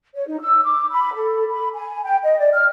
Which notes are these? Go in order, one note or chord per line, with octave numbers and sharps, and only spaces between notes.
C#5
D#4
E6
D6
B5
A4
B5
G#5
G5
D#5
D5
F6